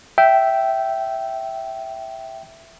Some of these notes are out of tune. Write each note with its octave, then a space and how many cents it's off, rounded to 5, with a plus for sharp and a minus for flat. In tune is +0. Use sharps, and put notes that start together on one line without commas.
E5 +0 G5 -15